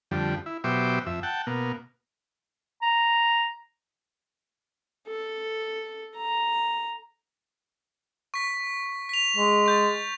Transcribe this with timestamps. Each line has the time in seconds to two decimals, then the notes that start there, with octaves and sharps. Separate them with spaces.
0.11 F2 D3 G3
0.46 E4
0.64 B2 F#3 G4 C5 E5 D6
1.06 F2 E5
1.23 F#5 G5 A5
1.47 B2 A#3
2.82 A#5
5.08 A4
6.17 A#5
8.34 C#6 B6
9.09 B6 F7
9.37 G#3
9.66 C#6 G6 A6